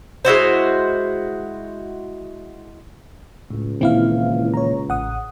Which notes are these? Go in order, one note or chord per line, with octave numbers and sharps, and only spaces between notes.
G#3 E4 F#4 C5
C#2 A2
A#2 D#3 E3 C4 E4 F5
C#5 A#5
A1 F#5 D#6